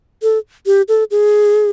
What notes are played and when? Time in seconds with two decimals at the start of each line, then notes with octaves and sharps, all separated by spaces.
0.23 A4
0.66 G4
0.88 A4
1.11 G#4